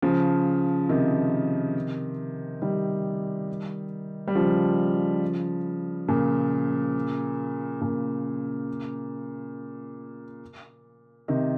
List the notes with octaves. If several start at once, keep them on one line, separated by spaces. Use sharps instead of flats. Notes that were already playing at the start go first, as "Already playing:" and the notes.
C#3 F3
C3 D#3
D#3 G3
G3
C#3 F3
A#2 C#3
A#2 C#3
C3 D#3